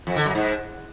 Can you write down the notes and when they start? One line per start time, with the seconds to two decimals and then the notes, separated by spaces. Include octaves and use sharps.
0.07 F2
0.16 D3
0.26 F#2
0.35 G#2